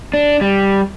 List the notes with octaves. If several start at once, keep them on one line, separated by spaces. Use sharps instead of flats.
D4
G3